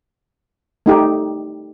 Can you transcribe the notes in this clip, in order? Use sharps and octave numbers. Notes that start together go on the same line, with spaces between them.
A3 D#4 G4